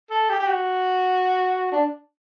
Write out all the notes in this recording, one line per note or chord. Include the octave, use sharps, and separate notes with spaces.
A4
G4
G4
F#4
D4